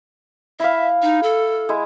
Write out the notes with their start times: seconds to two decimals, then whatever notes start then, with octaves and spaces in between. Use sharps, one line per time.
0.60 E4 E5 F5
1.02 D#4
1.23 A4
1.69 G#3 E4